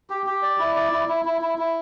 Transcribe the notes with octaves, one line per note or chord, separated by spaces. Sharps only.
G4
G4
D5
E4
D5
E4
E4
E4
E4
E4